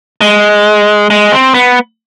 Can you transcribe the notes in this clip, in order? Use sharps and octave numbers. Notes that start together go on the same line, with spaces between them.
G#3
G#3
C4
B3